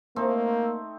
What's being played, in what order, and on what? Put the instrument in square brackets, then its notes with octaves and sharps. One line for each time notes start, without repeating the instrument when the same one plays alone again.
[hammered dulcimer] A3 C4 D#4 [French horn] A#3